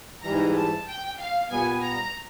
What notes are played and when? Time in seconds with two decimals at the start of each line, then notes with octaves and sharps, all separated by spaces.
0.22 G#2 E3 G3 A#5
0.55 A5
0.86 G5
1.18 F5
1.50 A#2 G3 B3 G#5
1.82 A#5